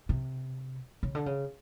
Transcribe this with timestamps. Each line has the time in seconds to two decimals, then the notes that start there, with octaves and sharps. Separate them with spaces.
0.09 C3
1.03 C#3
1.15 D3
1.26 C#3